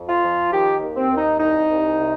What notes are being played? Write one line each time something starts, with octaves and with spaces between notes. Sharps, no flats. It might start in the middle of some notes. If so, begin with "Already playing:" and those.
Already playing: F2
F4
F3
D#3 G4
D#2
C4
D#2
D#4
C2 D#4
C2
C3